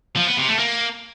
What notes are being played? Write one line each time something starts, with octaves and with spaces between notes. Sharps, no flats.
F3
B3
C3
A3
A#3